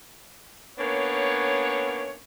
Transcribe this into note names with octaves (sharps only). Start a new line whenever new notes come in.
A#3 B3 C#4 D4 C#5